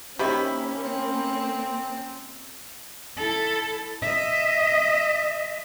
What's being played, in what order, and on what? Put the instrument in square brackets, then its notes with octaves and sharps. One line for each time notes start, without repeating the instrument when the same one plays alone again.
[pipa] C3 D#3 E4 [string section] A#3 C#4 [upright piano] G4 B5
[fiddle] C4
[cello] E4 A4
D#5 E5